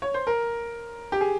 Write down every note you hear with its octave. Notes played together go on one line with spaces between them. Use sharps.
C#5
C5
A#4
G4
G#4